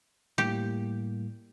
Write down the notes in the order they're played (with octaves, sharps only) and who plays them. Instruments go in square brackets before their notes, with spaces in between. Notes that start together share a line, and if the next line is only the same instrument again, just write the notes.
[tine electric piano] A2 G3 A#3 [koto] G4